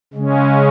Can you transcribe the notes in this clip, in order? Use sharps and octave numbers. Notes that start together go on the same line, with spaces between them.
C#3 G#3 C#4